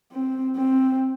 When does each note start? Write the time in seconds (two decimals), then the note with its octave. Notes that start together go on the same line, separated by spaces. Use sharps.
0.13 C4
0.57 C4